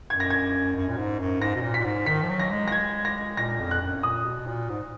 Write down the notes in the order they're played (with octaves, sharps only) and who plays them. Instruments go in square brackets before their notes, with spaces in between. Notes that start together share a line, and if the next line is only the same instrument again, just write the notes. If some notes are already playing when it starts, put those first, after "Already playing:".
[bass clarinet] F#2 [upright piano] G#6
[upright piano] A#6
G#6
[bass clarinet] F#2
A#2
G#2
F#2
[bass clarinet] G#2 [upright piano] A#6
[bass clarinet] B2
A#2
[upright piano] B6
[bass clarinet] A#2
G#2
[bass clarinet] D#3 [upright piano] B6
[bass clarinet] F3
F#3
[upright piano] A#6
[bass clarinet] G#3
[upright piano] A#6
G#6
A#6
[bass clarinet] A#2 [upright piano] A#6
[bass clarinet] F2
[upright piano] F#6
[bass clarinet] F#2
[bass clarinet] A#2 [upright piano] D#6
[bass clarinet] B2
A#2
G#2